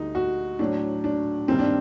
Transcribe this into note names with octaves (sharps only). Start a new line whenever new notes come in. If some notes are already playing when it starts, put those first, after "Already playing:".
Already playing: D2 D3 G3 D#4
F#4
A2 F#3 D4
D4
G2 D#3 G3 C4
D4